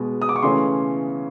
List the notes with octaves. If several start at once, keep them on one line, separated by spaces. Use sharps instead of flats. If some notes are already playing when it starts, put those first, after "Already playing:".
Already playing: B2 G#3 B3
D#6
D6
C#6
C#3 E3 A3 C#4 C6